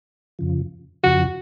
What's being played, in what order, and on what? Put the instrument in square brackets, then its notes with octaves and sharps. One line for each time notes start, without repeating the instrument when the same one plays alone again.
[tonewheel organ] F2 C#3 F3
[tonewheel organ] F2 C#3 F3 [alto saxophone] F#4